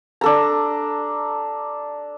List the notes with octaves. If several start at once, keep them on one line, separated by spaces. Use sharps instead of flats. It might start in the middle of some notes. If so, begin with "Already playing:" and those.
D4 A4 A#5